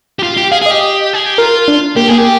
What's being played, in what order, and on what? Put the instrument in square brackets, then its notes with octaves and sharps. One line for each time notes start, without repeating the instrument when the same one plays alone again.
[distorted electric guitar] G4
F4
G4
[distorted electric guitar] G#4 [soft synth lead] F5
[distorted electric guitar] G#4
[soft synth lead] D#5
[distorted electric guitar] G4
[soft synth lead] D#5
[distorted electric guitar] G#4
G4
[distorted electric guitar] F4 [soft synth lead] A#4
[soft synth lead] D4
[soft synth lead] A#3 [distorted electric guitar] G4
[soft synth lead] A#3 [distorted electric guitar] G#4
[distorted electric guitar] G4